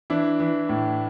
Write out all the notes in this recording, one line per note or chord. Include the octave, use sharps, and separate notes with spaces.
E3 D4 E4
E3
A2